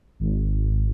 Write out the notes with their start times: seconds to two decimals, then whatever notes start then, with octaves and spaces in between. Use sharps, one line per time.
0.20 G#1